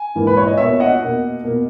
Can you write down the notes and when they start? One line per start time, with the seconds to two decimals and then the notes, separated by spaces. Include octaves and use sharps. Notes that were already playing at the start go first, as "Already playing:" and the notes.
Already playing: G#5
0.15 G#2 E3 A#3
0.27 B4
0.37 C#5
0.47 D#5
0.58 B2 A#3 C#5 E5
0.80 D#5 F#5
1.01 B2 A#3
1.44 B2 A#3